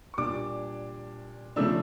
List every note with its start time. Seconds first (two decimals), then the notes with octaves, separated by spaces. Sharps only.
0.14 C#6
0.18 A#2 G3 D4 D6
1.56 C#3 F3 A3 D4 E6